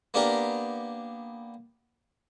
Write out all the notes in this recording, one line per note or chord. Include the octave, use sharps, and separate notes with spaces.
A#3 B3 D4 G4 A#4